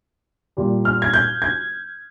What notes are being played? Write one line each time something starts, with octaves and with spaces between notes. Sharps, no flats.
A#2 G3
F6
G#6
G6
G#6